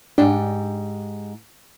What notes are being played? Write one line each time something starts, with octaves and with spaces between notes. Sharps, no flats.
G#2 D4 G4